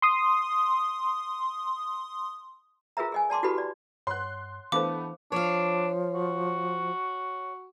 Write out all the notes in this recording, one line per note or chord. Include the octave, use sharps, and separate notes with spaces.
C6 D#6
F4 G#4 A#4 B4 E5 A#5
G#4 D#5 G#5
D5 A5 C6 D6
E4 F#4 G4 A4 B4 B5
D5
G2 C#5 F#5 C6 F#6
E3 A3 B3 D4 E4 C5 F5 D6
F3 D4 C#5 F5
F#4